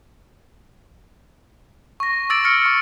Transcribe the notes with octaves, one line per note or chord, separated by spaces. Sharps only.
C#6 A#6
D6 E6 A6 D7
F6 C#7
C#6